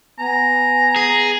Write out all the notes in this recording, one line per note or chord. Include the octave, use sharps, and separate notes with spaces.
B3 G#5 A#5
G#4